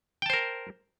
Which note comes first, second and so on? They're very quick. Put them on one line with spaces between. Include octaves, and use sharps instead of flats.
G5 A5 C5 A#4